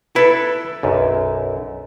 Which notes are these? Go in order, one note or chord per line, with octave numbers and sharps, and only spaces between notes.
E4 A4 B4
B1 F#2